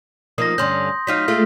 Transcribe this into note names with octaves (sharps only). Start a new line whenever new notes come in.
F3 A#3 D#4 D#6 A#6
G2 D3 C#4 C6 G6
F#3 D#4 F4 F6 G6 B6
G#3 A3 F4